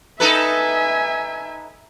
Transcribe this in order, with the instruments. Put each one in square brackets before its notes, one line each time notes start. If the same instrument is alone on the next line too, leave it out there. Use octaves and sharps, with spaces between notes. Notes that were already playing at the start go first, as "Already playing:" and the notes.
[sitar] D#4 A4 B4 [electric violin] E5 G#5